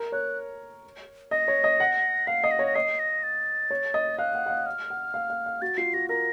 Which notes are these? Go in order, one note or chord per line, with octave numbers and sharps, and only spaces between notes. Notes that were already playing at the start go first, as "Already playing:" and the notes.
Already playing: A#4
C#5 F#6
D#5 A#6
C#5
D#5
F#5
F5 C7
D#5
A#6
C#5
A#6
D#5 C7
A#6
A6
C#5
D#5
F5 F#6
F#5
F#5
F5
F6
F#5
F5
F5
F5
F#4 A6
F4 C7
F#4 A#6
A#4 A#6